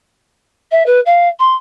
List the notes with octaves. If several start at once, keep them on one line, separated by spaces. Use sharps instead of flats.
E5
B4
F5
C6